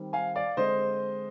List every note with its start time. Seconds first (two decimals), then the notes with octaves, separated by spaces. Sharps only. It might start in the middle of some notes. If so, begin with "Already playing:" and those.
Already playing: D#3 G3 C4
0.13 F5 G#5
0.35 D5 F5
0.57 D3 G#3 C4 C5 D#5